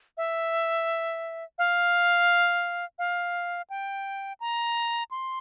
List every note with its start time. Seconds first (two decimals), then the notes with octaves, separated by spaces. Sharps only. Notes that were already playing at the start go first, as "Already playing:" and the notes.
0.17 E5
1.58 F5
2.99 F5
3.70 G5
4.40 A#5
5.11 C6